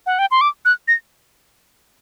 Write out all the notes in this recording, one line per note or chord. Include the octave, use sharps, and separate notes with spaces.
F#5
G5
C6
D6
F#6
A#6